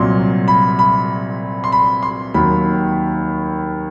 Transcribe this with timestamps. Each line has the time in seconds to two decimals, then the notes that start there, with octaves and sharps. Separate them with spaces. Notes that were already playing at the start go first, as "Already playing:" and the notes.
Already playing: C2 A#2 F#3 C6
0.48 B5
0.79 B5
1.64 C6
1.72 B5
2.03 C6
2.34 D#2 D#3 F#3 B5